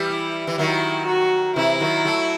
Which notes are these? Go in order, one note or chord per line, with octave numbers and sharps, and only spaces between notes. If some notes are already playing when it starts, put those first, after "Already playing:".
Already playing: E3 G3
E4
E3
D#3 F#3 E4
F#4
C3 E3 E4
D#3 F#3
F#3 A3